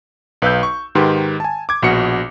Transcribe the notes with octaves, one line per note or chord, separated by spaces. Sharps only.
B1 B4 F5 E6 G6
C#6
G#2 D#3 G4 B4 C6
G#5 A5
D6 G#6
A#1 B2 F#4 C#7